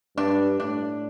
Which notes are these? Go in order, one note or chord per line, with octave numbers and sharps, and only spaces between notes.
G2 D4
A2 D4